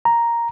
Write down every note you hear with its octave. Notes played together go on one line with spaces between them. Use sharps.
A#5